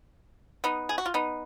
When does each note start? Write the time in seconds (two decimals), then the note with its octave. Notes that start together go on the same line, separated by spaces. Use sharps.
0.64 B3 D#4
0.89 G#4
0.98 F#4
1.06 F4
1.14 B3 D#4